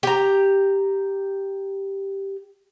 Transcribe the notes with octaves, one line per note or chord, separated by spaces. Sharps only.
G4 A#5